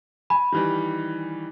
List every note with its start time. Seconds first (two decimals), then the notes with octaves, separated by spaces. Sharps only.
0.30 G#5 B5
0.52 D#3 E3 G3